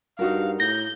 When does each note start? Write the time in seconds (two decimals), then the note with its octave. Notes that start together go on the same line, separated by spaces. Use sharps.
0.19 G2 D#4 F#4 A#4 F5
0.60 A2 G6 A#6